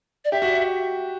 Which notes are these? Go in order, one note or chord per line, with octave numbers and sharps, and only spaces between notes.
D5
G4 E5
F#4